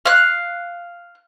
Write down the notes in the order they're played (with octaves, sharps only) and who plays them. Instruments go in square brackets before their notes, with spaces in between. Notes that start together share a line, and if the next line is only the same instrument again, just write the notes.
[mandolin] F5 F#6